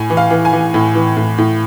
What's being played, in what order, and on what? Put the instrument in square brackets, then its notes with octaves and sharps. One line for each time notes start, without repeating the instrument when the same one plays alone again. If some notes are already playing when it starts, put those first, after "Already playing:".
Already playing: [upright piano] A2 G#5
E3
F5
E3
G#5
E3
A2
E3
A2
A2